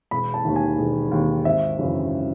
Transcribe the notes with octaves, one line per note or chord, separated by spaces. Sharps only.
E1 B5
A5
D#2 D#3
G#5
E1
D#2 D#3
G#1 E5
F#2 C#3 E3